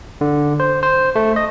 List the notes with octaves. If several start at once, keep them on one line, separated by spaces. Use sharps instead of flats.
D3
C5
C5
A3
D#5